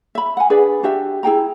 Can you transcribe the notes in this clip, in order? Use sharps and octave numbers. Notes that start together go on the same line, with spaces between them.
E5 B5
F#5 G#5
D4 G#4 B4 D5
D4 F#4 G4 E5
E4 G#4 G5 A#5